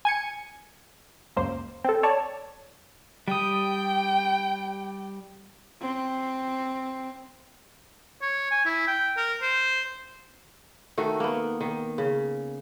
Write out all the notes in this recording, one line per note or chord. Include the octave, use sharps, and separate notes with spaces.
G#5 G#6 C#7
C#2 F#2 A#3 C5
C4 A4
C#5 D5 A5
G3 G5 D#6
C4
C#5
G#5
E4
G5
A#4
C5
D#3 A3 F#4
A#3 B3
D#3
C#3